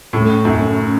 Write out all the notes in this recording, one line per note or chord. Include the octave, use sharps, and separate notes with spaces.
A2 C#3
F#2 A3 C#4
C#3